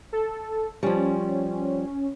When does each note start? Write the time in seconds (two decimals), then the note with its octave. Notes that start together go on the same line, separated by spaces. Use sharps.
0.13 A4
0.83 F3 G3 C#4